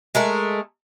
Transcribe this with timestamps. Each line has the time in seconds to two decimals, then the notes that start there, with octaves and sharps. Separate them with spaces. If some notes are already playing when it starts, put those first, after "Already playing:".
0.15 G#3 A3 A#4